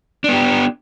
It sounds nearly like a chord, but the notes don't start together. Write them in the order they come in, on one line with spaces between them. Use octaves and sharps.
D4 B3 G4